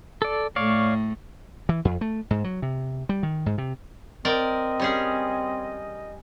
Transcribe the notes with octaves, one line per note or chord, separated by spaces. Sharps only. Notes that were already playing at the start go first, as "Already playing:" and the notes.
A4 D5
A2 A3 C#5 D5 F5
E3
F2
A3
G#2
F#3
C3
G3
D#3
G#2
C3
C4 A#4 D5 D#5 G5
G3 C#4 G#4